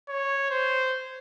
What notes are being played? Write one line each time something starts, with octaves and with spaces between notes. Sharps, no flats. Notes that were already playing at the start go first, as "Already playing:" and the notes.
C#5
C5